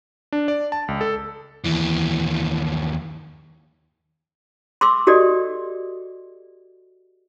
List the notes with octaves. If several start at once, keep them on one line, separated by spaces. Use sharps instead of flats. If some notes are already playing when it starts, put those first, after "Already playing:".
D4
D5
A5
C#2
A4
D#2 E3
C6 D6 E6
F#4 G4 A4 D5 D#5